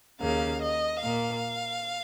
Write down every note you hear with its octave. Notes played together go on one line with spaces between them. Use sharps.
D#2 C#3 A#3 F5
D#5
A#2 A#3 F5